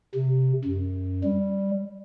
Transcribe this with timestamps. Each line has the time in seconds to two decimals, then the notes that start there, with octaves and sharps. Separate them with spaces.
0.15 C3
0.65 F#2
1.24 G3